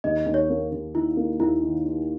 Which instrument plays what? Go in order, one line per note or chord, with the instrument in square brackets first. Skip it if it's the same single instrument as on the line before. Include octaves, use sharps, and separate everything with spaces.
[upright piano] D#2 [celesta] D#5
[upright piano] D#2
[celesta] C#5
[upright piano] A#3
D#2
[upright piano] D#3 [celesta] E4
[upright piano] A#3
[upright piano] D#2 [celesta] E4
[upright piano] D#3
D#3